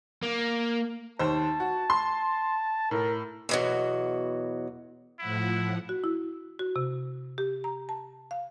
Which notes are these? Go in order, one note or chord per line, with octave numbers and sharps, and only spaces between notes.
A#3
D#2 C5 A5
F#4
C6
A2 A#4
E2 B2 F#3
A2 F3 E4 F#5
F#4
E4
F#4
C3
G4
A#5
A5
F5